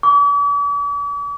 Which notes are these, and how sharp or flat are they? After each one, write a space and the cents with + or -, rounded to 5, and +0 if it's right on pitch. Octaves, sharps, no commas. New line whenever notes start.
D6 -45